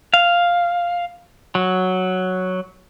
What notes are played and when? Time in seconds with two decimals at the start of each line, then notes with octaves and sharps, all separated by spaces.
0.14 F5
1.55 F#3